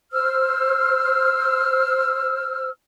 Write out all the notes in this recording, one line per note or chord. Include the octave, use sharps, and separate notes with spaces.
C5 E6 F6